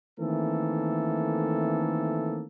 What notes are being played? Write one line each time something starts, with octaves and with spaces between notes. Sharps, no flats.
D#3 E3 A3 A#3 C4 A4